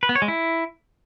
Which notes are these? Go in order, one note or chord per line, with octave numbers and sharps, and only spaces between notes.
B4
B3
C#5
G#3
E4